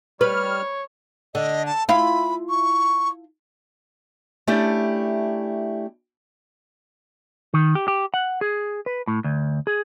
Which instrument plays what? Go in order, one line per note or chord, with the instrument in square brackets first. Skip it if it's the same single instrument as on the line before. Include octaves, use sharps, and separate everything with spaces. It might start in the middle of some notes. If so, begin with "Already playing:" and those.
[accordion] G3 F6 [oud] B4 [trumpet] C#5
[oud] D3 [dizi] D#5
[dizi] A5
[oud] E4 F4 [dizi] B5
[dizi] C#6
[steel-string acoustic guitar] A3 C#4 D4 E4 G4
[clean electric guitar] D#3
G4
G4
F#5
G#4
B4
A2
D2
G#4